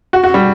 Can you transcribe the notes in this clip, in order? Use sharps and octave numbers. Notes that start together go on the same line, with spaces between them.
F#4
F#4
G3